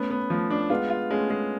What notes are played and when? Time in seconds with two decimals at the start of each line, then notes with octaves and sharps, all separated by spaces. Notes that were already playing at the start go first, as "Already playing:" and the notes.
Already playing: A3 B3 C#4
0.10 B3
0.30 F3 A3
0.50 D4
0.70 G#3 B3 F4
0.90 F4
1.10 G#3 A3 C#4
1.30 G#3